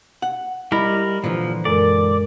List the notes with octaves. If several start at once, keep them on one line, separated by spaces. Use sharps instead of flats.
F#5
G3 E4 A#4 D#5 B5
A#2 D3 E3 F3
F#2 G#3 A4 A#4 D5